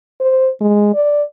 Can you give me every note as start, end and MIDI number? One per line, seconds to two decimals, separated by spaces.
0.21 0.49 72
0.61 0.90 56
0.95 1.23 74